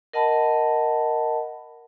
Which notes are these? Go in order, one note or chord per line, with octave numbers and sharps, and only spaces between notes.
A#4 D#5 F#5 A5 B5